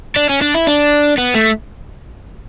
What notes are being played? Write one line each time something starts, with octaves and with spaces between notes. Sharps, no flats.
D4
C#4
D4
E4
D4
B3
A3